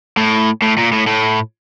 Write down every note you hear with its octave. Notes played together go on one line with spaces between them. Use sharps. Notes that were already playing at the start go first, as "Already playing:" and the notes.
A2
A2
A#2
A2
A2